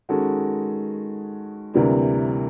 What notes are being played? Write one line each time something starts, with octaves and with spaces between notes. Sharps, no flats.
D#3 G#3 C#4 F#4 A4
D2 C3 E3 G3 A#3